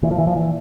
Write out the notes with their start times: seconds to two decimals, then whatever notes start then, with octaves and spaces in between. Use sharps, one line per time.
0.02 A#2 E3
0.11 F3
0.18 E3
0.27 F3
0.36 E3